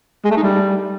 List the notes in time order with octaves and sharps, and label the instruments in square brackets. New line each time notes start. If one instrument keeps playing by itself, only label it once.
[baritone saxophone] G#3
A3
D#4
G3